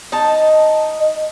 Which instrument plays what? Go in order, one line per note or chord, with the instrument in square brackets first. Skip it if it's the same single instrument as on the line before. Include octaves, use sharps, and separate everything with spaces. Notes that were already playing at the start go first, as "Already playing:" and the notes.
[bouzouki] D#4 D#5 A5